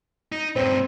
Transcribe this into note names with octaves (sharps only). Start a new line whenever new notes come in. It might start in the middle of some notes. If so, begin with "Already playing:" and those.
D#4
G2 A#2 C4